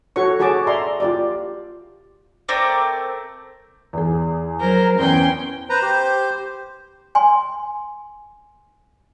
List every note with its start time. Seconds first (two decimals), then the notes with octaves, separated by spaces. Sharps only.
0.16 F#4 A4 C#5 C#6
0.40 F#4 G#4 C#5 A5 D6
0.67 D5 E5 A#5 C6
1.00 F4 G4 D5
2.49 A3 C4 A#4 D5
3.93 E2 G#4
4.60 F#3 A#4 C5
4.99 E2 B3 C#4 G5 C6
5.70 B4 C5 A#5
5.82 G4
7.15 G#5 C6